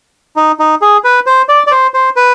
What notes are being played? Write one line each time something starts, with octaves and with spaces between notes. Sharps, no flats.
D#4
D#4
G#4
B4
C5
D5
D5
C5
C5
B4